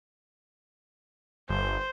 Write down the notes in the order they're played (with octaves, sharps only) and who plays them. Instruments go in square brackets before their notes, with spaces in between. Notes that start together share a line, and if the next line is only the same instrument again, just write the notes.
[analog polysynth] G1 [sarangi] C5